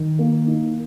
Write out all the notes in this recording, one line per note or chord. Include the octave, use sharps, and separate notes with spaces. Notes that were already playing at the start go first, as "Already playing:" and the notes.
Already playing: D#3
A#3
D#4